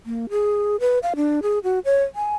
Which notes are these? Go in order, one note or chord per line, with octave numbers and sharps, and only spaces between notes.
A#3
G#4
B4
F5
D4
G#4
F#4
C#5
G#5